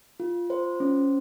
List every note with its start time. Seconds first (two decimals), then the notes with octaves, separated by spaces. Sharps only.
0.20 F4
0.50 C5
0.80 C#4